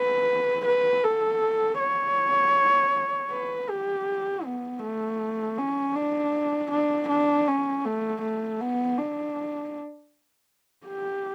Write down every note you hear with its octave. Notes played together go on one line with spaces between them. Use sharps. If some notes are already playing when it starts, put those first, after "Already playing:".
Already playing: B4
B4
A4
C#5
B4
G4
B3
A3
C#4
D4
D4
D4
C#4
A3
A3
B3
D4
G4